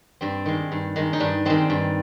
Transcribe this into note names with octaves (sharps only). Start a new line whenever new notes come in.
G2 C4
D#3 G#3
G2
D#3 G#3
D#4
G2 D4
D#3 G#3 C4
G2